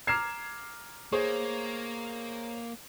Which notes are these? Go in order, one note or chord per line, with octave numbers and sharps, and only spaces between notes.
A#5 D6 F6 G#6 C7 E7
A#3 G#4 C5 C#5